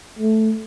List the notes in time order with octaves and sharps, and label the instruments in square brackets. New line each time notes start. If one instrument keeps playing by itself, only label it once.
[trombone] A3